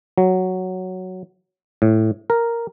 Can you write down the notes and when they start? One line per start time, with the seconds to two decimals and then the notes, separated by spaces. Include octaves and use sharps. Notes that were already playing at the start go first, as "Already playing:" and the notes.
0.18 F#3
1.82 A2
2.30 A#4